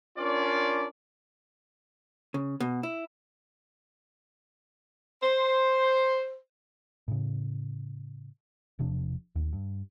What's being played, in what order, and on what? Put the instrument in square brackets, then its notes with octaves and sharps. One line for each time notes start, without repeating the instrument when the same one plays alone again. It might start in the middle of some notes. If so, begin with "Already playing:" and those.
[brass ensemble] C#4 D4 F4 A#4 D5
[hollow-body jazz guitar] C#3
B2
E4
[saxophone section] C5
[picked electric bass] A2 C#3
E1 C3 F3 D4
D1 D#2
G2